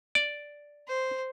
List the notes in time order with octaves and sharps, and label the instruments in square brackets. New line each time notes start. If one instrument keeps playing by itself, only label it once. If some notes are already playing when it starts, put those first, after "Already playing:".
[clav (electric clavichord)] D5
[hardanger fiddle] C5